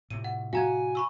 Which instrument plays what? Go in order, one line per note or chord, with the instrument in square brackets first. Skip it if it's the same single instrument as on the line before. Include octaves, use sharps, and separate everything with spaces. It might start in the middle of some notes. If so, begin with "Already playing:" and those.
[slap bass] A2 C3 [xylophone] D#7
[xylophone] F#5
[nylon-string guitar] F#4 [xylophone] F5 A#5 G#6 [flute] G#5
[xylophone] B5 C#6 E6